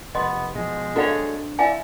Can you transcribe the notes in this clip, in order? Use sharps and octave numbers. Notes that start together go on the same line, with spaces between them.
F1 B3 D#5 C6
B2 F3 G#3
C4 D4 F#4 A4 C#5 D5 F5
E4 D5 F5 G#5